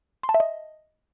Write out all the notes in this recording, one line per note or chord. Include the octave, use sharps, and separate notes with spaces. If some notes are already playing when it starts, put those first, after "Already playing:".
C6
A5
E5
D#5